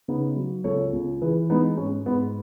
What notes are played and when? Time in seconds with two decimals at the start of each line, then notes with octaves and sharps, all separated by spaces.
0.08 C#3 B3 D#4
0.36 F#3
0.64 C#2 A4 C#5
0.93 C#2
1.21 E3 G#4 B4
1.50 G#3 B3 D#4
1.77 G#2 C#4
2.06 G#2 B3